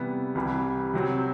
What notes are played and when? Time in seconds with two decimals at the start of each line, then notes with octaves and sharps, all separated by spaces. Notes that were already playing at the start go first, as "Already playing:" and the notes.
Already playing: C3 E3 G3 B3
0.35 C2 C3 E3 G3
0.94 C3 F#3 C4